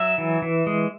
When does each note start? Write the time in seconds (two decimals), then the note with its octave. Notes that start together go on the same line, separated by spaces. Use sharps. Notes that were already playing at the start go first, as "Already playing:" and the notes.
Already playing: F#3 E5
0.18 E3
0.42 E3
0.67 G#3